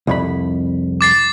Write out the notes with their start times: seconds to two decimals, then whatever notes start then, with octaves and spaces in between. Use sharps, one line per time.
0.07 C2 F2 B5
1.01 D6 A6 C7